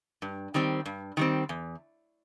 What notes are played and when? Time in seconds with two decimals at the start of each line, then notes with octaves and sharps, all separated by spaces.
0.22 G2
0.54 D#3 G3 C4
0.86 G2
1.17 D#3 G3 C4
1.49 E2